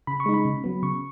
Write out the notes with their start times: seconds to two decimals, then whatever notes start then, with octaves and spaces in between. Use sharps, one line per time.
0.07 C#3 B5
0.20 C#6
0.26 G#3 D#4
0.34 B5
0.45 C#3
0.64 F#3 B3
0.83 C#3 C#6